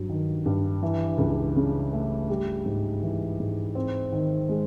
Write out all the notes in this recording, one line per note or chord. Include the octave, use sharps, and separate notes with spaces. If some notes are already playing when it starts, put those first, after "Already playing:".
Already playing: G2 F#3
D#3
G2
E3
C#2
C#3
A3
G3
G#2
E3
G#2
C4
D#3
G#3